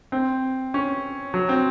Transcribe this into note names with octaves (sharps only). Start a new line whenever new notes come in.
C4
C#4
F#3
C4